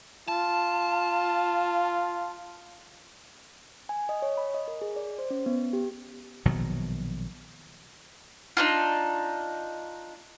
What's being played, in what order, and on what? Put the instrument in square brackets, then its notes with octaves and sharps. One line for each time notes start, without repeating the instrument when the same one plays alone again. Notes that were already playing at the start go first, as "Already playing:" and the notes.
[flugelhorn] F4 [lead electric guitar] A5
[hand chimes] G#5
D#5
C#5
B5
D#5
A#4
G#4
D5
C5
C#4
B3
G4
[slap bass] A#1 B2 D#3 F#3
[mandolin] D4 D#4 F4